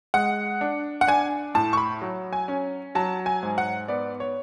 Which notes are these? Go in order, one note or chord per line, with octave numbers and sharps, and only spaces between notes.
G#3 F#5
D4
F#5
D4 G#5
A2 A5
C#6
B5
F#3
G#5
C#4
F#3 A5
G#5
G#2
F#5
B3 D5
C#5